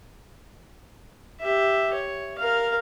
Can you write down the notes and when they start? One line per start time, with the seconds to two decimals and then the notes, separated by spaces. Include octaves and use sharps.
1.40 G4 E5
1.93 C#5
2.38 A#4 F5